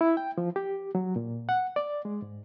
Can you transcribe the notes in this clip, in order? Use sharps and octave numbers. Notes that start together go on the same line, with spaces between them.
E4
G5
F3
G4
F#3
A#2
F#5
D5
G#3
G#2